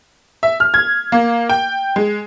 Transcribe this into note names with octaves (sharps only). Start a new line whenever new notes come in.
E5
F6
G#6
A#3
G5
G#3